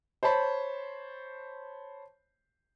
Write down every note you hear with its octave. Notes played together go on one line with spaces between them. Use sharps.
C5 C#5 A5 B5